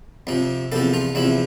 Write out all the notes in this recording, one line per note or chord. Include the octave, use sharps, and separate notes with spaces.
F2 C3 F3
E2 C3 F3 A4
F4
E2 C3 F3 E4